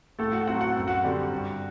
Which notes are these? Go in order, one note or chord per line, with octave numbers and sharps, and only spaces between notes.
A2 A3 A4
F#4 F#5
F#3 C4 F#4 F#5
F#5
F#2
F#4 F#5
D3 G3 C4
G2